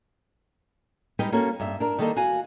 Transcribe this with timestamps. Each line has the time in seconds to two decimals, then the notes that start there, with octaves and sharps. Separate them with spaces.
1.19 G3 G#3 D#4 B4 D#5 G5
1.32 A#3 C#4 F#4 A4
1.60 G2 E5
1.80 D4 A#4
1.99 D#3 G3 A#3 A4 D#5
2.16 F#4 F5 G#5